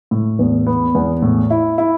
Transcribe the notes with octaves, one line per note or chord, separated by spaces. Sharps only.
A2
E2
B3
E2
A2
E4
E4